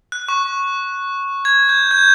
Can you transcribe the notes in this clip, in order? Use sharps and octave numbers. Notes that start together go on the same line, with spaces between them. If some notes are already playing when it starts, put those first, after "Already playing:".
F#6
C#6
G#6
G6
G6